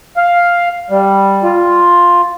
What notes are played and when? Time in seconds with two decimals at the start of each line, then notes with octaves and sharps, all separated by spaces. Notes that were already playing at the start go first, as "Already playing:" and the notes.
0.17 F5
0.90 G3
1.43 F4